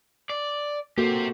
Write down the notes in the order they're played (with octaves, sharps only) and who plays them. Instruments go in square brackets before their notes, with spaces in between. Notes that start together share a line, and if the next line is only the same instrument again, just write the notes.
[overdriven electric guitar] D5
[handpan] A#3 F#4 A4 [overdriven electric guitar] C4 G4